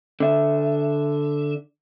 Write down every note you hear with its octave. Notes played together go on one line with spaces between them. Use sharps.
D3 E5